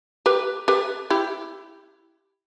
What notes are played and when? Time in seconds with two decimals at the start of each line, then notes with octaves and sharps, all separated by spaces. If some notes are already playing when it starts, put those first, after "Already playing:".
0.26 G4 B4
0.68 G4 B4
1.10 E4 G4